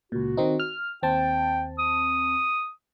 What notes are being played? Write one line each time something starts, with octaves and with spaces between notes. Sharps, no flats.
C#2 A#2 F#4
D#3 C4 D#4
F6
D#2 C4 G5 A5
D#6